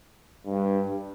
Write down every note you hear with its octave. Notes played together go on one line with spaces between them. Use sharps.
G2